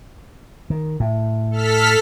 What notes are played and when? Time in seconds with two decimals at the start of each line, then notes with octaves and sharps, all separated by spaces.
0.70 D#3
1.00 A2
1.51 A4 F6 B6